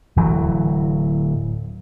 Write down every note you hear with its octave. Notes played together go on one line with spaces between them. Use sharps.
D1 E3 F#3